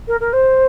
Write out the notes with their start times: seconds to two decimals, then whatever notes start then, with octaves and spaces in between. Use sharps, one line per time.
0.08 A#4
0.20 A#4
0.33 C5